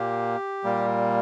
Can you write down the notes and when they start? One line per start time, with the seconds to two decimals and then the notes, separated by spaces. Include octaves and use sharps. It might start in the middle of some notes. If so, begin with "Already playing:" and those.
Already playing: A#2 A#3 G4
0.64 A#2 G3 A#3